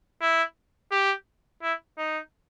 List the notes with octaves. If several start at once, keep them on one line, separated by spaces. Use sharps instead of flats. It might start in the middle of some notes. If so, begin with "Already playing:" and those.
E4
G4
E4
D#4